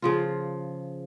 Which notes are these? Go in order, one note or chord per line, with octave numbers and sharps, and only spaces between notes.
C#3 F3 F4